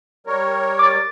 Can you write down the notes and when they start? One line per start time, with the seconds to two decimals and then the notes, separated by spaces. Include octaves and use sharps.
0.27 G3 A#4 C#5
0.79 D6 A6